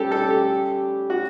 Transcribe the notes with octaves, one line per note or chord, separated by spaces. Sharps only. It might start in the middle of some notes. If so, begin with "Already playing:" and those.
Already playing: G3 C#4 G4 A4
A4
G4
F#4